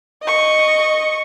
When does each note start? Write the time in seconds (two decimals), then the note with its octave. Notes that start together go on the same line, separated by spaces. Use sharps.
0.23 D#5 C#6